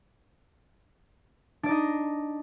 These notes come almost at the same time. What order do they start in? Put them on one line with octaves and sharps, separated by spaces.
D4 D5 D#4 D#5